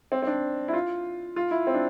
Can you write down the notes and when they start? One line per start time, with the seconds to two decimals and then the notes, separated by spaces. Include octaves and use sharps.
0.12 C4
0.22 C4
0.27 D4
0.68 E4
0.73 F4
1.36 F4
1.51 E4
1.67 C4
1.74 D4